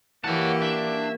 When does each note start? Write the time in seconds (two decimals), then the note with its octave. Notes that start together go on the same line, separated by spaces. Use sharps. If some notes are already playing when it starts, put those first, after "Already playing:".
0.24 E3 A#3 F#4 G4 C#5 D5 F#5 A5
0.62 D4 E5